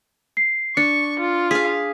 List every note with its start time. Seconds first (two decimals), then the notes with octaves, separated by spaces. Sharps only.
0.37 C7
0.77 D4 C#6 C#7
1.19 F4
1.51 G#4 F5 B6